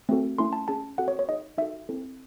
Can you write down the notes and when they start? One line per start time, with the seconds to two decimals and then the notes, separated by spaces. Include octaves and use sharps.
0.09 A3 C4 F#4 A4
0.38 A3 C#4 E4 A4 C6
0.53 A5
0.68 C#4 G#4 A5
0.98 C4 F#4 A4 F#5
1.08 C#5
1.19 C#5
1.29 D#4 G#4 D#5
1.58 D#4 F#4 A4 E5
1.89 C4 E4 A4